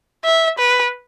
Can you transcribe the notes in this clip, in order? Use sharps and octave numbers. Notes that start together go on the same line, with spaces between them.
E5
B4